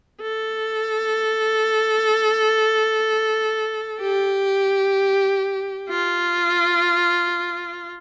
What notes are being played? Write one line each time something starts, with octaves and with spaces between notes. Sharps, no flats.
A4
G4
F4